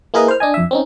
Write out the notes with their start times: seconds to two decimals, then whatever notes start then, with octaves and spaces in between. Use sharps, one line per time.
0.14 A#3 E4 G#4 A#4 B4 D#5
0.28 C5 F6
0.40 D4 D#5 G#5
0.54 F2 E5
0.71 C4 C#4 D#4